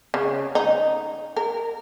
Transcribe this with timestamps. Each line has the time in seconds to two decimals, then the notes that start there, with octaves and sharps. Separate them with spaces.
0.14 C#3
0.55 D#4
1.36 A#4